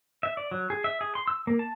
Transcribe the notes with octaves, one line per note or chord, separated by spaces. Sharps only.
E5
D5
F#3
G#4
E5
G#4
C6
E6
A#3
A5